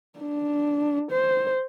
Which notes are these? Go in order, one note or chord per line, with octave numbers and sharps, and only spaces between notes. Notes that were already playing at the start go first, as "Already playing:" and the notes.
D4
C5